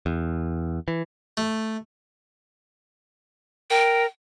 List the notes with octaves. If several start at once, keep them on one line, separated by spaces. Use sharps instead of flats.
E2
E3
A3
A#4 G5